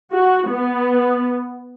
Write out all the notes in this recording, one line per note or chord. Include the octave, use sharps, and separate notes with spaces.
F#4
B3